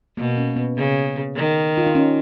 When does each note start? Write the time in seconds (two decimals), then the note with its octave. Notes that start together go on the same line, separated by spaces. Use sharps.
0.17 B2 A#3
0.37 C#4
0.56 B3
0.77 C#3
1.36 D#3
1.77 F4
1.87 D#4
1.95 C#4